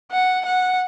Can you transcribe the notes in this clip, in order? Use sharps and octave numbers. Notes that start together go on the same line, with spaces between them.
F#5
F#5